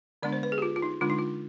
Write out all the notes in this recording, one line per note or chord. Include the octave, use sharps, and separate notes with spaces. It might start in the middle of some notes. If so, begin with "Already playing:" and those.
D3 G#3 B3 D4 D5
C5
B4
G#4
G4
F4
F4
D#4
D3 G#3 D4 F4
D#4
F4